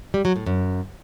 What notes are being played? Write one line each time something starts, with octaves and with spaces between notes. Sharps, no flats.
G3
F#3
A2
F#2